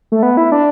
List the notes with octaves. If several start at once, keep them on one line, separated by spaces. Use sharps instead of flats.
A3
B3
E4
D4